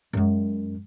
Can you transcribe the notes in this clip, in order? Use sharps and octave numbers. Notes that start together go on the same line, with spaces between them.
F#2 G#3